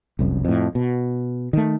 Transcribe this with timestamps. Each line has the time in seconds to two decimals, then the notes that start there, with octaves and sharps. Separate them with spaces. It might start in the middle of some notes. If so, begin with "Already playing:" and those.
0.19 F1 C2 F#2
0.45 F2 A2
0.75 B2
1.53 D#3 A3